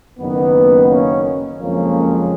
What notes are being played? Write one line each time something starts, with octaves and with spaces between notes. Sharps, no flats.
F#1 F#2 D#3 A#3 B3
A#3 C#4
F#1 F2 F3 G#3 A#3 C#4